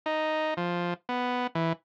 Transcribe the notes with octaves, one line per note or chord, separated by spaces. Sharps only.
D#4
F3
B3
E3